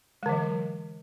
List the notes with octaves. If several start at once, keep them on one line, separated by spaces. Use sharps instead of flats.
D3 E3 F#3 G#3